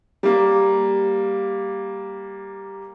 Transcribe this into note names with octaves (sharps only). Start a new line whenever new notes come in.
G3 A#3